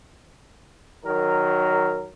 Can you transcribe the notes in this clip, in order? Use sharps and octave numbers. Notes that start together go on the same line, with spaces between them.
D#3 F#3 A#4